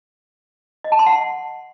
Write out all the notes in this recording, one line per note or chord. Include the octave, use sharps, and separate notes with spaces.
D#5
A5
C6
F#5